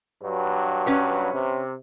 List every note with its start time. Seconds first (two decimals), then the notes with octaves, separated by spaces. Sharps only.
0.23 G2 F#3
0.86 C#4 B4 C#5
1.34 C3